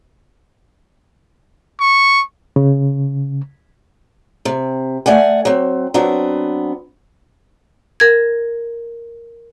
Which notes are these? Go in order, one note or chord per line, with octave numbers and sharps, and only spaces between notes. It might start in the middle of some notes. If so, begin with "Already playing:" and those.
C#6
C#3
C3
A3 D5 F#5 G#5
F#3 C4
F#3 B3 C4 D4
A#4 G#6